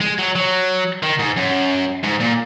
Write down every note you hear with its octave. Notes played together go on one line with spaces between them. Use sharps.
G#3
F#3
F#3
D#3
G#2
F#2
G#2
A#2